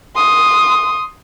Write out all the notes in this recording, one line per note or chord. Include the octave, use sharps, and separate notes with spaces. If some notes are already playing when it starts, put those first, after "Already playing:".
C6 D#6